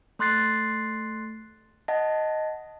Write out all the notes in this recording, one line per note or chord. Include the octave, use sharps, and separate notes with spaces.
A3 C6 F#6 A6 C7
D#5 F#5 A5 A#6